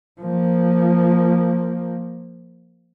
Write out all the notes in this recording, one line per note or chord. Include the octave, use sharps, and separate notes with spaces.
F3 A#3